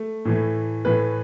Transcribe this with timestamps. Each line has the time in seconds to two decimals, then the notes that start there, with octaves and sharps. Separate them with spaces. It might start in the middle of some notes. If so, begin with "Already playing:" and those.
Already playing: A3
0.25 A2 E3 A3
0.85 A2 E3 A3 B4